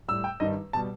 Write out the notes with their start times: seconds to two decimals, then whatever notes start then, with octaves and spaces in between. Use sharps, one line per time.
0.08 A2 G3 E6
0.24 G5
0.40 G2 D#3 G3 D#5
0.73 B2 G3 A5